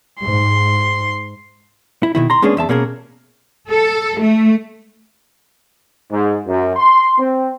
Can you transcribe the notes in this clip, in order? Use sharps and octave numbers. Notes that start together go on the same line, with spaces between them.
G#2 C6
E4
B2 D#3 E4
A#5 C6
G#3 A#3 B3 C#4 D4 G#4
E2 E5 A5
B2 A#3 C#4 G#4 A#4
A4
A3
G#2
F#2
C6
C4